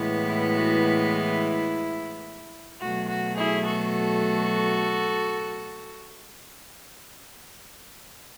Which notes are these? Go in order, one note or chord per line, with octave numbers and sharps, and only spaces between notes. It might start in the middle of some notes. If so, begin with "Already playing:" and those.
Already playing: A2 E3 G#3 B3
E4
F#4
E4
B2 F#3 A3 F#4
F#4
E4 G#4
F#4 A4